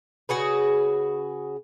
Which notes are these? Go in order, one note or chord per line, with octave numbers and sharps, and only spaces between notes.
C#3 F#4 G#4 B4